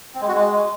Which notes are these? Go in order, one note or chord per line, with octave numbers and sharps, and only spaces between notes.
C4
G#3
F#4
G#3